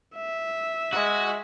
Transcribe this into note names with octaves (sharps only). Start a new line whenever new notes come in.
E5
G#3 F#4